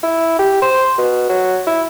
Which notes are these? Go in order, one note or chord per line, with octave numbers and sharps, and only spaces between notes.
E4
G4
C5
B2
F#3
E4